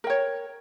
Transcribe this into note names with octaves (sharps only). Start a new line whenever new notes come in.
A#4 C#5 G5